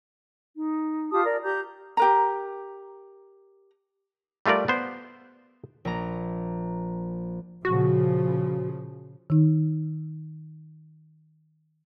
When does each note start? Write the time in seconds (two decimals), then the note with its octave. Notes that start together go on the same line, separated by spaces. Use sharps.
0.56 D#4
1.11 F4 G4 A5 D#6
1.25 A#4 D5
1.43 G4 A#5 G6
1.97 G4 A#4 A#5
4.46 G3 A3 F4 A#4 D5
4.68 B3 C5
5.85 A#1 A#5
7.65 A#2 C#3 F3 F#4
9.30 D#3 D#4